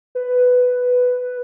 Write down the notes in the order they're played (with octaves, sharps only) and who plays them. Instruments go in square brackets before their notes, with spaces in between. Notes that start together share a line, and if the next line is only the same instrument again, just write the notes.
[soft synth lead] B4